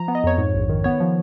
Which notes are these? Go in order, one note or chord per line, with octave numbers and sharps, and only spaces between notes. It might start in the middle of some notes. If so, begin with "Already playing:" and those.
Already playing: F3 A#5
B3
D#5
F2 C#5
G#2
A#1
D#3
B3 C#5
F3